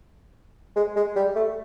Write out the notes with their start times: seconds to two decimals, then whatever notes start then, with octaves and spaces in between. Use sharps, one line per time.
0.76 G#3
0.96 G#3
1.15 G3
1.36 A3